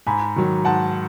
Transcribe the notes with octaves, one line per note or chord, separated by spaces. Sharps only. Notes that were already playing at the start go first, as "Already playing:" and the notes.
G#2 G#5 B5
D#3 F#3
G#2 F#5 A5